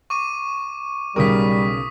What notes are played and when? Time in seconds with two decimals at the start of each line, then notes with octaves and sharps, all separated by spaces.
0.10 C#6 D6 D#7
1.16 B1 C#3 G3 A#4 C#6 D#6 B6